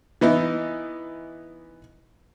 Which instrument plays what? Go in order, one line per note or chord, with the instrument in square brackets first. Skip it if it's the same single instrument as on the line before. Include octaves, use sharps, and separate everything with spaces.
[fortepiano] E3 B3 D#4 E4